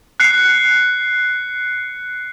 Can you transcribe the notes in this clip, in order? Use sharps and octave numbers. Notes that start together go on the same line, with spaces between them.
F#6 C7 C#7